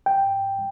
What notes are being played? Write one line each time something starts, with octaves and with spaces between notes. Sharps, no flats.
G5